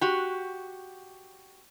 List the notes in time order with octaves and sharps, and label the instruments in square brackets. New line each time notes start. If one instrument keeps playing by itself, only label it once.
[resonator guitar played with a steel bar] F#4 G4